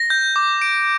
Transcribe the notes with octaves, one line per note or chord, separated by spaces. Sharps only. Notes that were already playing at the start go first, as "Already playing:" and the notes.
Already playing: A#6
G6
D6
D7